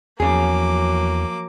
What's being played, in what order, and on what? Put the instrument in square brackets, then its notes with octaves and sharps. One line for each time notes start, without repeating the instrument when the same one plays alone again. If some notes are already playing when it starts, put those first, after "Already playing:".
[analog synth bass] E2 [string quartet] F3 F#3 [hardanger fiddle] A#3 D6 [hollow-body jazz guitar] C#4 G#4